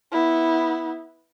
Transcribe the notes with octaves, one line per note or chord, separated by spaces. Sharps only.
B3 E4